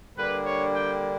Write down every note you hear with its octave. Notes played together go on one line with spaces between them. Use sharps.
D3 G3 A#3 D4 B4
C#5
G5